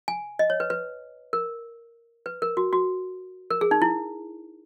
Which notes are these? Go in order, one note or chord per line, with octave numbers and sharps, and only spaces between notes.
G#5
D#5
C#5
B4
B4
A#4
B4
A#4
F#4
F#4
A#4
G#4
D#4
E4